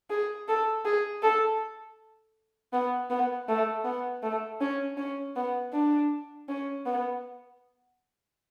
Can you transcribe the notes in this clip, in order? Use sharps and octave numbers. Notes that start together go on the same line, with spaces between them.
G#4
A4
G#4
A4
B3
B3
A3
B3
A3
C#4
C#4
B3
D4
C#4
B3